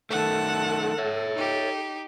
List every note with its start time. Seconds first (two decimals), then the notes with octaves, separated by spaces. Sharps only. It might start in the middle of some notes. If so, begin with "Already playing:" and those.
0.10 D#3 A3 A4 F#5 A5
0.98 C#5 E5
1.35 D#4 G4